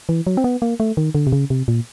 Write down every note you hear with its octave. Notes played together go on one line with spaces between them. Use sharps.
E3
F#3
C4
B3
A#3
A3
D#3
D3
C3
C#3
C3
A#2